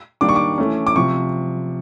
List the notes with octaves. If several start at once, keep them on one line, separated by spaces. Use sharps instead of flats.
D#3 G3 A#3 D4 D6
C#6
D6
E3 A3 C#4
D6
C3 F3 C#6